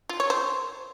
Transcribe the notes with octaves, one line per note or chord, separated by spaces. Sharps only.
F4
C#5
C5